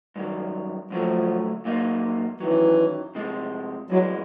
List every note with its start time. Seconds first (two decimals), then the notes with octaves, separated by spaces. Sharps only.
0.16 G2 D#3 F#3
0.90 G2 D3 F3 F#3 A3
1.65 A#2 F#3 A#3 D#4
2.40 F#2 D#3 E3 F#3
3.15 C3 F3 G#3
3.90 G2 E3 F#3 G#3